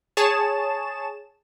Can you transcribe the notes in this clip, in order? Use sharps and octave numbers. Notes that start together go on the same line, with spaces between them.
G#4 C#5 A5 E7